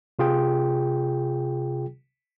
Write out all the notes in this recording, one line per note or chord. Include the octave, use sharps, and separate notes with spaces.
C3 F4 G#4 G5